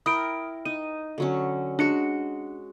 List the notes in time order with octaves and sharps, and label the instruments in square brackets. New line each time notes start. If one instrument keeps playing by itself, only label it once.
[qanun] E4 A#4 G5 [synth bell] D#6 D7
[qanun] D#4 [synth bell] D#7
[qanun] D3 F#3 C#4
[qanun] G#3 F#4 [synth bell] D4 C#7